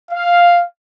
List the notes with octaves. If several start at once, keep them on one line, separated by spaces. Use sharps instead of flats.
F5